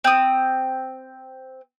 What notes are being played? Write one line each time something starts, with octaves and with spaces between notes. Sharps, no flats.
C4 D#6